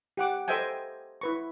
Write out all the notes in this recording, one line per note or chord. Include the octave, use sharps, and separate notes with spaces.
G4 F#5 D6
A4 C5 D#5 E5 G5 G#5
E4 B4 C#6